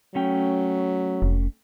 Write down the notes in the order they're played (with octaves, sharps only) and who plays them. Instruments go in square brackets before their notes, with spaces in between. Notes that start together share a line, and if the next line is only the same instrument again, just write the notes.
[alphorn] F#3 [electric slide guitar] A3 C#4 G5
[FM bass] F1